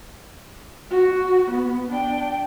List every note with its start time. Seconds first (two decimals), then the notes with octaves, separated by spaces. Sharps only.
0.91 F#4
1.51 B3
1.88 D4 G5